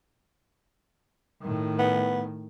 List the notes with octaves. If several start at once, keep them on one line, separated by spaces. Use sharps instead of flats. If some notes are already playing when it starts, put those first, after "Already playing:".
A2 D#3
B3